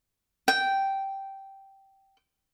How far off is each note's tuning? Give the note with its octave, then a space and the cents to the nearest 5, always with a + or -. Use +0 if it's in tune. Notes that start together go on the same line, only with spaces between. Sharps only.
G5 -10